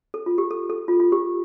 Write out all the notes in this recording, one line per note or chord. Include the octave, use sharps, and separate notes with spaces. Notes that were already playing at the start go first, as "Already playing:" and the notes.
A4
F4
G4
A4
A4
F4
F4
G4